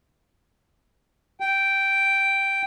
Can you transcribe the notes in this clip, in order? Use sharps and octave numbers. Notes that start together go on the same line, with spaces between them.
G5